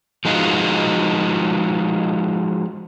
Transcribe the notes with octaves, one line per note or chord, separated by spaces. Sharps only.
F3 G#3 D#4 F4 F#4